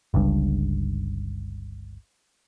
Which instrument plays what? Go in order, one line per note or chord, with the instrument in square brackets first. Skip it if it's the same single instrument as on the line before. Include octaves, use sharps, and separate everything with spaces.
[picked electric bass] G1 C#2 G2